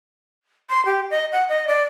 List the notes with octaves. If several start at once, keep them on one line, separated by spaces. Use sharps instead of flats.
C6
G4
D#5
F#5
D#5
D5